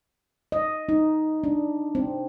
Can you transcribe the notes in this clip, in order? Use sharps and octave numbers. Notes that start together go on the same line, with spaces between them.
D#5
D#4
D4
C4